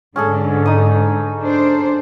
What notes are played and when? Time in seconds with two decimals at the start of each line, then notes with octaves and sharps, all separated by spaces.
0.16 G#2 D3 C#4 G#4 A4
0.66 D#4 D#6
1.43 D4 C5